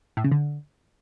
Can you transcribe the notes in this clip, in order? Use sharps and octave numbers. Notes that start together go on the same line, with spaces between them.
A2
C#3
D3